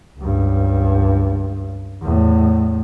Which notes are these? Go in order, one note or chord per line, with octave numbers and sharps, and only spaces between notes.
C#2 G2
E2 A2